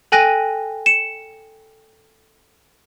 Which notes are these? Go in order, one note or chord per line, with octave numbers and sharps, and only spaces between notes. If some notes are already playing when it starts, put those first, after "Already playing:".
A4 G5 G#5 F#6 A#6 D#7
C#7 E7